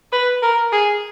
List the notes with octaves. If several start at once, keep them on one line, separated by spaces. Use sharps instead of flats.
B4
A#4
G#4